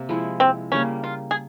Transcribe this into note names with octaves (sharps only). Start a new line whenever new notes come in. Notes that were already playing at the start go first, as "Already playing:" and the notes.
Already playing: C3 A#3
F3 G#3 E4
C4
C#3 G3 A#3 C#4
F4
G#4